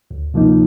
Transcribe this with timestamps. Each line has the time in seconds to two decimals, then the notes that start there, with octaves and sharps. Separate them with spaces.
0.11 D2
0.34 C3 F3 A#3 D#4